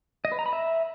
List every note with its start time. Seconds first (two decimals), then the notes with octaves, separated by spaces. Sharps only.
0.25 D#5
0.32 B4
0.39 A#5
0.46 B5
0.53 E5